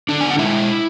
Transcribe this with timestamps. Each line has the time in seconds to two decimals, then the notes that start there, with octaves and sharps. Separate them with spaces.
0.09 D3 D4 D5
0.21 B3 G#5
0.30 F#5
0.38 G#3 E4 E5